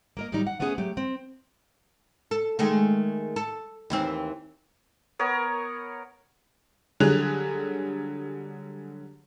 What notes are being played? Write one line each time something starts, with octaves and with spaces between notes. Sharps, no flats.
A#3 A#4 D#5
A2 D#3 F#3 G3 D#4
F#5
A3 B3 C#4 E4 G#4 F#5
F#3 A3 G4
C4
A4
D#3 G#3 A3
A4
D#2 E3 C4
B3 A#4 C#5
D3 F#3 G3 G#4 F#6 F7